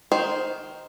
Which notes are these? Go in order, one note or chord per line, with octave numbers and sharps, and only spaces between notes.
D#3 C5